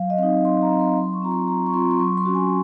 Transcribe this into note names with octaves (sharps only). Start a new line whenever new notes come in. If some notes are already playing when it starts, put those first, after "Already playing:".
Already playing: F#3 F5
D#5
C4 D#4 F5
F#3 C6
A#5
C4 D#4
C6
F#3 C6
C#6
C4 F4 A#5
C6
F#3 A#5
C#6
C4 F4 C6
C6
F#3 C#6
C6
C#4 F#4
G#5